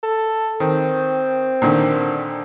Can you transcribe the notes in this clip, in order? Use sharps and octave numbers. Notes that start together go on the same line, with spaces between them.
A4
D#3 C4
A#2 D3 D#3